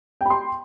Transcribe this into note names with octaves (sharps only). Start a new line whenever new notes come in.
G5 B5 C6